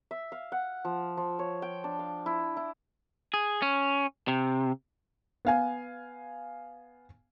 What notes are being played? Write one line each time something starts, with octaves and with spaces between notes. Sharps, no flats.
E5
F5
F#5
F3
F3
C#5
G5
D4
F5
E4
E4
G#4
C#4
C3
B3 F5 G#5